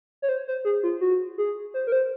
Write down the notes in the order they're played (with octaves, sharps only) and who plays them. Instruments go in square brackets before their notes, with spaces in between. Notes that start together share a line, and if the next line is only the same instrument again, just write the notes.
[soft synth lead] C#5
C5
C5
G#4
F4
F#4
G#4
C5
A#4
C5